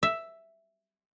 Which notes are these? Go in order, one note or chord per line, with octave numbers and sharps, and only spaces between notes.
E5